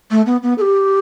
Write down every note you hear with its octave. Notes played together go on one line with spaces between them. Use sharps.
A3
B3
B3
A4
G4